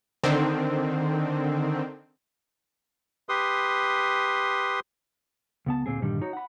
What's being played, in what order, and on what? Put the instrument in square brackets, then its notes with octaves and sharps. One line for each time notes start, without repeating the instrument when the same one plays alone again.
[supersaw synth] D3 D#3 C4
[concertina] G4 B4 C6 D#6
[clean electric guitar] C#2 B3 A5
D2 A#2 C4 G#4
G2 A#2 D3 D#3 G3
D#4 F#4 C#5 A#5
F#5 B5